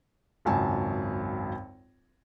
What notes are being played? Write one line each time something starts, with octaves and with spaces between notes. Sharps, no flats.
G#1 C#2 F#2 G#5 A5